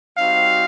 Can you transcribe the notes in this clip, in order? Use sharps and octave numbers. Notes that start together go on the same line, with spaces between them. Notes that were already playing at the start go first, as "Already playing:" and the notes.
G3 C4 D#4 F#4 F5